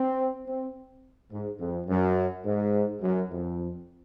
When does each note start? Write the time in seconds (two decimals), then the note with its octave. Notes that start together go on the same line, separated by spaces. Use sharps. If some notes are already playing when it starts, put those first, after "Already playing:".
Already playing: C4
0.47 C4
1.32 G#2
1.60 F2
1.87 F#2
2.44 G#2
3.01 F#2
3.30 F2